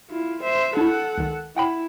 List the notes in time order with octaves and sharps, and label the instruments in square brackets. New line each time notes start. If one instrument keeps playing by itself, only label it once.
[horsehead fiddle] E4 F4
C5 E5
[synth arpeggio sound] D4 E4 [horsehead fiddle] A4 F#5
[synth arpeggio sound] C#2 D#3
[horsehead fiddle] E4 [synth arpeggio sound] F#5 G5 B5